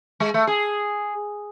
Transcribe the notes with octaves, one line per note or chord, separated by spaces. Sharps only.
G#3
A3
G#4